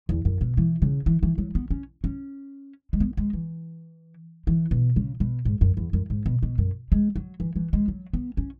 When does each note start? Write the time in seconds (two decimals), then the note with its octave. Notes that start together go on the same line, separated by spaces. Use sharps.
0.09 E2
0.25 F#2
0.41 B2
0.57 E3
0.82 C#3
1.06 E3
1.23 E3
1.38 F#3
1.55 B3
1.71 C#4
2.04 C#4
2.93 G#3
3.00 B3
3.17 G#3
3.33 E3
4.47 E3
4.71 B2
4.96 C#3
5.20 B2
5.45 G#2
5.61 F#2
5.77 E2
5.93 F#2
6.10 G#2
6.26 B2
6.43 B2
6.58 F#2
6.92 G#3
7.16 F#3
7.40 E3
7.56 E3
7.73 G#3
7.88 F#3
8.13 B3
8.37 C#4